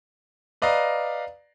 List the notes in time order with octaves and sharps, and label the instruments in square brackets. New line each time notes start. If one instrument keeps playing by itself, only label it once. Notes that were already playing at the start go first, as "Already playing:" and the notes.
[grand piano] B4 D5 D#5 F5 A#5